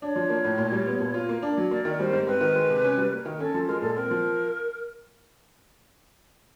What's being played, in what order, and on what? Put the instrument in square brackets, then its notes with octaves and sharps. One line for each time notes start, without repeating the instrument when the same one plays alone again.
[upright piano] D4 [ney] C#5
[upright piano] F3
A#3
A2
A#2
G3
B3
A#2
F4
A#3
D4
F#3
[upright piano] A#3 [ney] D5
[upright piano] D#3
[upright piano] G3 [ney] C5
[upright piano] G#2
[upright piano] C4 [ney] B4
[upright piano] D#3
G#3
C3
C#4
G3
A#3
D#3
[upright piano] C#4 [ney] A4
[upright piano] F3
[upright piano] G#3 [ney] A#4
[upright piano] A#2 [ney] A4
[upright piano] C4 [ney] A#4
[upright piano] F3